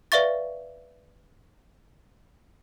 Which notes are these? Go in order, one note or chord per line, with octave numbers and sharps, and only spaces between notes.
B4 D5 E5 F5 C#6 A6